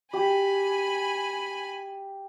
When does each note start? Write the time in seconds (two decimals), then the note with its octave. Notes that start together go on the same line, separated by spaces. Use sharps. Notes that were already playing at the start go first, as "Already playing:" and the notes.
0.13 G4 G#5 B5